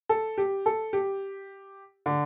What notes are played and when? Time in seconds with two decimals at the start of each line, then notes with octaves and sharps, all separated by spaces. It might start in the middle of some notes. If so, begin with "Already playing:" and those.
0.09 A4
0.38 G4
0.66 A4
0.93 G4
2.06 D3